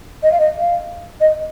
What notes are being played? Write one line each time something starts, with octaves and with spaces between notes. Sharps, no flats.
D#5
F5
D#5
F5
D#5